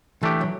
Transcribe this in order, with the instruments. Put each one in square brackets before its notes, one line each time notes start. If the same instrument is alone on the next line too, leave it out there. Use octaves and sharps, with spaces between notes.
[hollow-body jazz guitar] E3 [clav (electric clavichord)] A3 D4 G4
[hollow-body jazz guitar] F#3